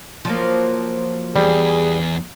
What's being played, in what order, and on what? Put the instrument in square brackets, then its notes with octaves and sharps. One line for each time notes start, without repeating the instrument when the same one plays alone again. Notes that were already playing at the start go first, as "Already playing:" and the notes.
[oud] F3 F#3 A#3
[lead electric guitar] E2 [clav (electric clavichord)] G3 [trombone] G#4